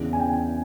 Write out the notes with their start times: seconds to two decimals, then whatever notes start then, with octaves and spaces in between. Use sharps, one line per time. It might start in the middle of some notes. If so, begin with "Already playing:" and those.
Already playing: E2 C#3 E3
0.13 G#5
0.19 G5